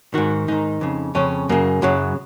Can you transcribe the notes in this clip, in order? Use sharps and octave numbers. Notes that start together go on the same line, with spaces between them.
G#2 D#3 F#4
G#2 D#3 D#4
F2 C#3
F2 C#3 C#4
F#2 C#3 A#3
F#2 C#3 F#3